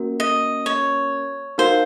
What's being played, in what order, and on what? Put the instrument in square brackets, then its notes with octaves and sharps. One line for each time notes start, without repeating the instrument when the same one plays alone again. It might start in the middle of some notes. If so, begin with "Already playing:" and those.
Already playing: [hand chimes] A#3 C#4 F#4 A#4
[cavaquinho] D#5
C#5
[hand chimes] D#4 F#4 A#4 F5 [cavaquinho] C5